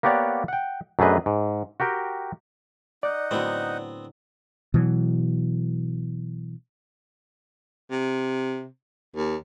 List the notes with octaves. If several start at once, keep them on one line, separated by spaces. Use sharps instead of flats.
A#3 B3 G4 C#5 D5 F#5
F#5 G5
F#2 A3 D4 G#4 B4 D#5
G#2
F#4 G4 A#4 G5
D#4 D5 D#5 F#5
A2 D3 F#3 B3 C4
B2 E3 F#3
C3
D#2